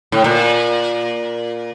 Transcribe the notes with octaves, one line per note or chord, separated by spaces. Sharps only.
A2
A#2